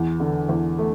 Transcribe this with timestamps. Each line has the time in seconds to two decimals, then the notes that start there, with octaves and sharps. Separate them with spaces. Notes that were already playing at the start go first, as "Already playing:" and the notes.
Already playing: E2
0.20 D3
0.49 E2
0.78 A3